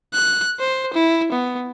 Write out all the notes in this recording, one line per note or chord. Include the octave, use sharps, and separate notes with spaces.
F#6
C5
E4
B3